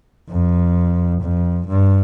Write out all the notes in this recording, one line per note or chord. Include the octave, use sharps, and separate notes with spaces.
F2
F2
G2